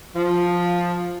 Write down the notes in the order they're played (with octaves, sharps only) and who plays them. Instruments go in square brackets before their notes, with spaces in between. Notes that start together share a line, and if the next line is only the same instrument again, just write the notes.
[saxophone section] F3